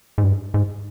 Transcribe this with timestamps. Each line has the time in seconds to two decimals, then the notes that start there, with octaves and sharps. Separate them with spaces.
0.18 G#2
0.24 G2
0.54 G#2